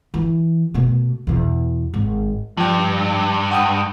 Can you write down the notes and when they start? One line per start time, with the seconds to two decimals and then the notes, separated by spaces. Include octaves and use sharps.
0.14 E3
0.74 B2 A3
1.27 E2 B2
1.94 G#1
2.57 G2 F3 G5
3.51 F#5 G5 D#6